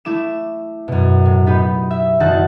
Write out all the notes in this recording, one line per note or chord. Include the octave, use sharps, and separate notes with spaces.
A3 E4 D6 E7
F#2 B2
A2
B3 D#4 G4 B4
E5
F#1 D#3 D#4 F#4 A5 F#6